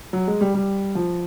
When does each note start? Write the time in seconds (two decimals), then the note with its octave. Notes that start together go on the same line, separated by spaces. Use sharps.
0.13 F#3
0.27 G#3
0.41 G3
0.54 G3
0.95 F3